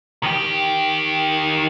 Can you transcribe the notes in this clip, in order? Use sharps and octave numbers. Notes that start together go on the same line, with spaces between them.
D#3 G4